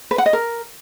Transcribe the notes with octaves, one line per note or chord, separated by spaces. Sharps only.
B4
F#5
D#5
A#4